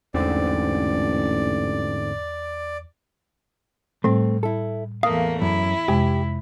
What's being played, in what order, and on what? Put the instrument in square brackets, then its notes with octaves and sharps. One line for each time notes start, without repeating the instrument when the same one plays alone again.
[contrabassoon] A1 [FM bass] E2 [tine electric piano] G#2 D3 C4 [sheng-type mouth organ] D5
[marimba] A2 G3 [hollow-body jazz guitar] A3 C4
[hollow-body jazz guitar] E4 A4
[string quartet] E2 A3 A#3 [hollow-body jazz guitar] F5 [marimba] D#6
[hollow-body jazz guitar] F#2 [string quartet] E4
[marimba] F2 C3 G#3 [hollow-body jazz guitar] G4